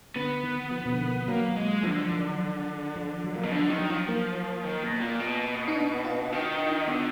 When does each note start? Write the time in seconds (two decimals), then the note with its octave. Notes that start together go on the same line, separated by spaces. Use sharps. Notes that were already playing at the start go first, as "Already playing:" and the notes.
0.16 D3 B3
0.43 D#3
0.71 F3
0.86 B2
0.92 D3
1.00 D#3
1.28 F#3 A#3
1.56 G#3
1.83 D3 F3
2.12 D#3
2.96 F3
3.24 F#3
3.34 A#2
3.43 B2 D#3
3.52 D3 F3
3.70 D#3
3.80 F#3
3.90 F3
4.08 A#3
4.64 D#3
4.83 B2
5.01 A#2
5.20 B2
5.68 D#4
5.76 D4
6.04 F4
6.32 D#3 F#4
6.60 D#4
6.88 D3 B3